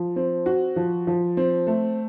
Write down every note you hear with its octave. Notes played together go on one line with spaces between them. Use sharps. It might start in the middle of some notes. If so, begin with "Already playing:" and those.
Already playing: F3
C4
F#4
F3
F3
C4
A3